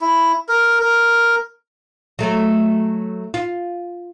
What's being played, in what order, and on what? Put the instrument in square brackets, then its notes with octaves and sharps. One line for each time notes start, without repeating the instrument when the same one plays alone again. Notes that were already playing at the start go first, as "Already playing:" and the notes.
[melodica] E4
A#4
A#4
[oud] F#3 A3
F4